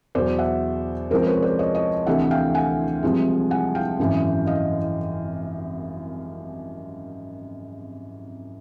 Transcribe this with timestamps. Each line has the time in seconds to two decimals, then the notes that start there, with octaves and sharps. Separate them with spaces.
0.15 E2 B2 F#3 C5 D5
0.38 E5 F#5
1.11 C#2 C3 F3 G#3 A#4 C5
1.27 B4 C#5
1.42 C5 D5
1.59 C#5 D#5
1.75 C#5 D#5
2.06 D2 C3 E3 A3 E5 F#5
2.31 F5 G5
2.54 F#5 G#5
3.03 C2 C3 F3 G#3
3.51 F#5 G#5
3.75 F5 G5
3.99 G#1 F#2 C#3 E3
4.47 D#5 F5